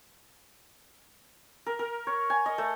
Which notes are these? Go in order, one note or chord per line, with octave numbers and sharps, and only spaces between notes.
A#4
A#4
C#5
G#5
D#5
A3